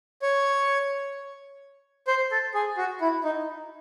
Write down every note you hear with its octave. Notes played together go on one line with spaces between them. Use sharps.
C#5
C5
A4
G#4
F#4
E4
D#4